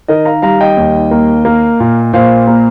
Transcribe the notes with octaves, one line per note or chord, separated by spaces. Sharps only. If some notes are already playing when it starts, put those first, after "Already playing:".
D#3 A#4 D#5
F5 A#5
G3 F5 A#5
D#5 G5
D#2
A#3
A#3
A#2
A#2 C5 F5
A#3